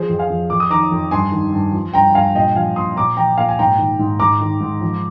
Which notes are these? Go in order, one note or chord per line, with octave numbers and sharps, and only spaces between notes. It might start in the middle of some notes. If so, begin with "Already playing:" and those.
Already playing: F3 G#4 C5
F2
F5 G#5
F2
F2 D6
D#6
D#3 A#5 D6
F2
G2 G#5 C6
D#3
G2
F3
G2 G5 A#5
G2 F5 G#5
A#2 D#5 G5
F3 F5 G#5
A#2 C6 D#6
A#2 A#5 D6
F3 G5 A#5
A#2 F5 G#5
G#5
G#2 G5 A#5
D#3
G#2
G#2 A#5 D6
D#3
G#2
F3